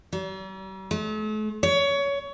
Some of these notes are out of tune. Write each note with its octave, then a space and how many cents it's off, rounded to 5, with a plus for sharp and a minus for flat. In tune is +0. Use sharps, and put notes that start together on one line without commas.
G3 -45
A3 -40
C#5 +20